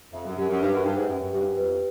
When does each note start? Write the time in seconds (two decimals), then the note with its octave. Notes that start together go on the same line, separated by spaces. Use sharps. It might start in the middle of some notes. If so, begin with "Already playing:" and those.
0.13 F2 E5
0.26 F#2
0.37 F#2 G4
0.49 F#2
0.61 G2 B4
0.73 F#2
0.84 G2 G5
0.96 G#2
1.08 F#2 E5
1.20 F#2
1.32 F#2 G4
1.40 G2
1.44 F#2
1.56 F2 B4